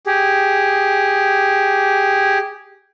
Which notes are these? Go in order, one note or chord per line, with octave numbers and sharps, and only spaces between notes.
G4 G#4